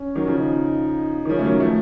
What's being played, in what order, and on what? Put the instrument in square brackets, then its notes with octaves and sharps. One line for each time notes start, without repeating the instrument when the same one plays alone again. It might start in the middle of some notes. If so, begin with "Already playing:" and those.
Already playing: [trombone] C#4
[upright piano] D#3 F#3
C#3 F3
[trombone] D#4
[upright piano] D#3
[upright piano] C#3 F3 [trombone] C#4
[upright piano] A3
D#3 F#3
F3 A3